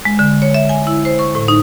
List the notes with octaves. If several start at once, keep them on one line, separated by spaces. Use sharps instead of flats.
G#3
D3
C#5
E5
G#5
E4
C5
C#6
A2
D#4